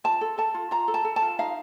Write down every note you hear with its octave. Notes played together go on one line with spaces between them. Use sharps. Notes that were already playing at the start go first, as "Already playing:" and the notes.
F4 A5
A4
A4 A5
F4
F4 A#5
A4
A5
A4
A5
F4
D#4 F5